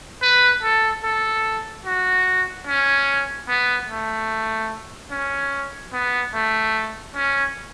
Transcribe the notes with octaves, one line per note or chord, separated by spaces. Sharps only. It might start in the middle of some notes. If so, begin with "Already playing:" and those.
B4
A4
A4
F#4
C#4
B3
A3
C#4
B3
A3
C#4